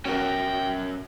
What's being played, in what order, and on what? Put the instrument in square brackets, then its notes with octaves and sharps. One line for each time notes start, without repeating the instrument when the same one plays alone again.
[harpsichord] F#2 B2 [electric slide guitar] C#4 A#4 [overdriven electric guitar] G5